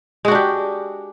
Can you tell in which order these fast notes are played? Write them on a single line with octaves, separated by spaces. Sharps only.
G#3 F#4 D4 G4